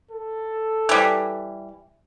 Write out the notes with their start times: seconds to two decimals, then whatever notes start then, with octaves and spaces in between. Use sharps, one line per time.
0.11 A4
0.89 E3 G3